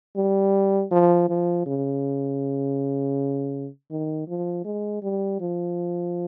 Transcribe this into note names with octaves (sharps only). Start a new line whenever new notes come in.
G3
F3
F3
C#3
D#3
F3
G#3
G3
F3